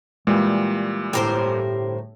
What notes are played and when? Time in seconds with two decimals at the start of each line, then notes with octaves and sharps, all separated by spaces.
0.27 A#2 E3 G3 G#3
1.13 G1 A2 G4 A#4 C5